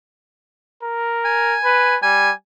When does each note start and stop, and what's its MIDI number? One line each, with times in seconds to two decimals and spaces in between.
0.83 1.57 70
1.25 1.97 80
1.64 1.97 71
2.03 2.31 55
2.03 2.32 80